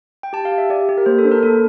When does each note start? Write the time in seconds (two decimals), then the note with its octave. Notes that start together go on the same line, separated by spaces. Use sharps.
0.23 G5
0.33 G4 A5
0.45 F5
0.52 G4
0.58 E5
0.70 G4 D5
0.89 G4
0.98 A#4
1.06 A#3 C5
1.18 A4
1.24 D4 C5
1.31 A#4
1.43 A#3 A4